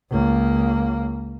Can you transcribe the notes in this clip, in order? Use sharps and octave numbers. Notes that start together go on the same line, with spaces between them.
C#2 A#3